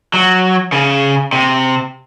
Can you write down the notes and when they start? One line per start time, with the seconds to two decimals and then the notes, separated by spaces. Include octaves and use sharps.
0.14 F#3
0.72 C#3
1.33 C3